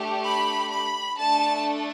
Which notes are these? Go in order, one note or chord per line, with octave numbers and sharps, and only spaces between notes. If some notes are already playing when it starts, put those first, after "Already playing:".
Already playing: A3 D4 G4
B5
B5
A3 D4 A4 A5